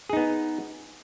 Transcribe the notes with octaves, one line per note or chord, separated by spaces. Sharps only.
B3 D#4 G#4